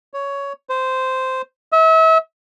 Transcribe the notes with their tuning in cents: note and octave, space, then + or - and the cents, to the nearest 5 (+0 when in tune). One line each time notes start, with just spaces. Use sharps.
C#5 +10
C5 -10
E5 -35